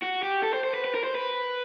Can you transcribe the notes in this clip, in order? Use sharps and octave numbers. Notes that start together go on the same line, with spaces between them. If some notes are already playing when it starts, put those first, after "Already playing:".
F#4
G4
A4
C5
C5
B4
B4
A#4
C5
B4